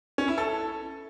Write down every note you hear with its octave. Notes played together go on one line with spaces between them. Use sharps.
C#4
E4
A4